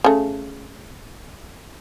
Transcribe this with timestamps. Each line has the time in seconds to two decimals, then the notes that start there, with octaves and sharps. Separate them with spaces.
0.04 C#3 A3